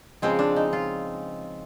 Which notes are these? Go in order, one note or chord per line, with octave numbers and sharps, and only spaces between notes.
C#3 F3 G#3 C4
D4
D#4
F4